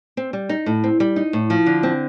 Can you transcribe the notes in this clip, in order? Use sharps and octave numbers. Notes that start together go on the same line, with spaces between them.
C4
G3
D#4
A2
C4
G3
D#4
A2
F3
D3
C4